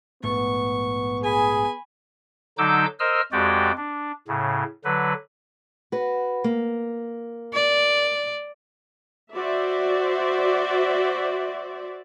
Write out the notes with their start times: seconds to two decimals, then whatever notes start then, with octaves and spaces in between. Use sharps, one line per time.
0.23 A#1 G#2 A3 B3 C#6
1.24 G#4 G#5 B5
2.58 D3 F#3 D#4 D6 E6 G6
2.99 A#4 C5 D#5 E6 F6
3.32 F2 G#3 F#4 G4 D5 G5
3.77 D4
4.28 A2 C#3
4.84 D3 F#3 B4
5.92 F#4 B4
6.44 A#3
7.53 D5
9.32 F#4 C5 D5 E5